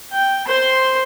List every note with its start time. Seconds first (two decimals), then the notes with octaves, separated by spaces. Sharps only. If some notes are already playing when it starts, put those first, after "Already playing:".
0.12 G5
0.47 C5 C6